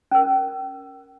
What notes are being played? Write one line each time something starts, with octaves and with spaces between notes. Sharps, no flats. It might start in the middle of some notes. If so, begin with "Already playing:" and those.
C#4 A#4